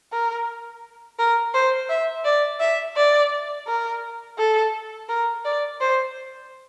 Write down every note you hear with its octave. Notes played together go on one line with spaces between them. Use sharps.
A#4
A#4
C5
E5
D5
E5
D5
A#4
A4
A#4
D5
C5